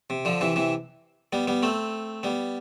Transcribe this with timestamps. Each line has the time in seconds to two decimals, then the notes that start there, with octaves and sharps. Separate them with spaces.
0.10 C3
0.25 D3 F3
0.41 C3 E3
0.56 C3 E3
1.33 G3 B3
1.48 G3 B3
1.63 A3 C4
2.23 G3 B3